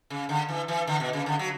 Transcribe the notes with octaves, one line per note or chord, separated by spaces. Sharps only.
C#3
D3
E3
E3
D3
B2
C#3
D3
F#3